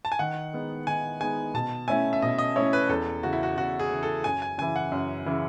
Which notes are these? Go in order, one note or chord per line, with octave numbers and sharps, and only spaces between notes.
A5
G#5
D#3 F#5
G#3 B3 D#4
D#3 G#5
G#3 B3 D#4 G#5
B2 A5
A3 C#4 E4 G#5
E5
B2 D#5
D#5
A3 C#4 E4 C#5
B4
E2 A4
C#3 E3 F#4
E4
F#4
E2 F#4
G#4
C#3 E3
A4
F#2 G#5
G#5
C#3 E3 G#5
F#5
F#2
C#3 E3